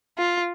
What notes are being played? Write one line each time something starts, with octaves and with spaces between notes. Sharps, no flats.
F4